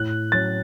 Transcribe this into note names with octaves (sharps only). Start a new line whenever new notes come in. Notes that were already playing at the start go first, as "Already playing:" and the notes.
Already playing: A2 F#6
F#3 C#4 A6